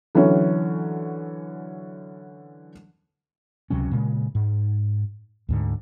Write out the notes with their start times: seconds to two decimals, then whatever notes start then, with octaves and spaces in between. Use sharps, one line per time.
0.15 D3 E3 F#3 C#4
3.70 C#2 C3 F#3 C#4
3.92 A#2 C#3 G#3
4.35 G#2
5.49 D2 G#2 D3